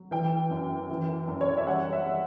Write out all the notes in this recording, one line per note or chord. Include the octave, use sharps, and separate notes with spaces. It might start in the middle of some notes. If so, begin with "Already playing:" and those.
Already playing: F#3
E3 G5
F#2
E3
F#2
C#5
D5
E5
G3 F#5
E5
G3